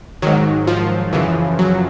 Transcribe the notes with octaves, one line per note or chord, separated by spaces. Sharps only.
G#2 D#3 F#3
F3
F#2 C#3 E3
F#3